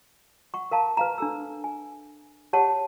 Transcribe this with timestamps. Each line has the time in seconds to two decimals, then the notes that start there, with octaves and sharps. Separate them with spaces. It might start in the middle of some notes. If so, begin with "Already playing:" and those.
0.54 F#5 C#6
0.71 A#4 F5 A5 A#5
0.97 B4 F5 A#5
1.18 D4 A4 E6
1.64 G#5
2.53 G4 C#5 F#5 A5